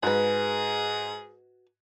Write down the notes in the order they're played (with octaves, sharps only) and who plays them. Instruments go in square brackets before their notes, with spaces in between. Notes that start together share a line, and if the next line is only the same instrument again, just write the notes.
[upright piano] G#2 [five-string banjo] F#4 B4 [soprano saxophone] G#4